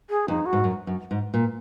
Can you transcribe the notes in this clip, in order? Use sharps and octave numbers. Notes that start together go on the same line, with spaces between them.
G#4
F2 D#4
F#4
G#2
F#2
F#2
G#2
A#2